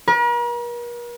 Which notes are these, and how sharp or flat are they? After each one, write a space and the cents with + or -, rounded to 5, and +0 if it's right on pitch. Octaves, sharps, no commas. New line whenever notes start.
A#4 +45